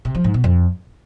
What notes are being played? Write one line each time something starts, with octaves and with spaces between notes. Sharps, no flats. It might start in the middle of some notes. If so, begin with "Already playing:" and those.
C3
F3
G#2
B2
F2